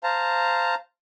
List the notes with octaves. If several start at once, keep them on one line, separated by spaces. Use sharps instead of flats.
C5 F5 A5 A#5